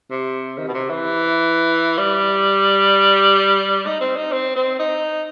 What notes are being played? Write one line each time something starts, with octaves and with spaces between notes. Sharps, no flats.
C3
D#3
B2
C3
E3
G3
D#4
C4
D#4
C4
C4
D#4